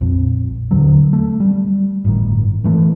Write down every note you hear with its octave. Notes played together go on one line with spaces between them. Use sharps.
A#1 F2
D#2 D3 F#3
A3
G3
G1 A2 D#3
D#3 E3 A3